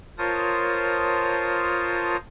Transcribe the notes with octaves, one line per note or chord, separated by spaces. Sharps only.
F4 A#4 C5 C#5 A5 D#6